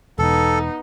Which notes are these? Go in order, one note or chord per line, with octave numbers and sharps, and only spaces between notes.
E1 B3 D#4 A4